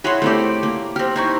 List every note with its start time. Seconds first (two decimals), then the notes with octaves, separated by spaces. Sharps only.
0.04 E4 F#4 G#4 C#5 E5 C6
0.22 A3 C4 E4 G4 D5
0.63 A#3
0.96 C4 G4 F6
1.16 C4 D#4 E4 C#6